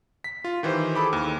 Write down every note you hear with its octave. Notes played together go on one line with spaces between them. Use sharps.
B6
F4
D#3 E3 G4 C5
G#4 A4 B5 D6
D#2